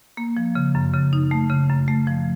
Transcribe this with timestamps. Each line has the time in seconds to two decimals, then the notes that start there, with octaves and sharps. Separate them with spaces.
0.17 A#3
0.37 F3
0.55 C#3
0.75 F#2
0.94 C#3
1.13 D#4
1.31 A3
1.50 C#3
1.69 F#2
1.88 A3
2.07 F3